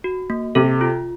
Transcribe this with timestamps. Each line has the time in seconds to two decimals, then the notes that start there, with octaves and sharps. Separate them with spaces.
0.04 F#4
0.30 A#3
0.55 C3 A4
0.81 F4